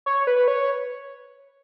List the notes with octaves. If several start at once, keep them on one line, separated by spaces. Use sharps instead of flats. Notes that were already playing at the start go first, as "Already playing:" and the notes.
C#5
B4
C#5